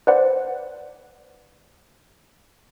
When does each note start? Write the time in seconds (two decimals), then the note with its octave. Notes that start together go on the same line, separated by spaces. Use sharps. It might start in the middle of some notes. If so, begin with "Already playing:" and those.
0.07 B4 C5 D5 F#5